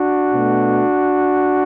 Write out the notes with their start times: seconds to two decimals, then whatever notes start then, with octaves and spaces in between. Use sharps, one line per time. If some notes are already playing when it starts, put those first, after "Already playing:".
Already playing: D4 F#4
0.31 B2 A3